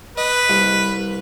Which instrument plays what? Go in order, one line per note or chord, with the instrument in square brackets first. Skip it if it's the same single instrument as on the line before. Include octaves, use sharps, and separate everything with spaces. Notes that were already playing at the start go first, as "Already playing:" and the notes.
[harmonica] B4 [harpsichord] D#5
[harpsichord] C2